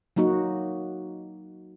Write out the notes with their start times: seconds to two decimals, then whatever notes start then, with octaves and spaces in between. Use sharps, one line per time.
0.16 F#3 A#3 D#4 F#4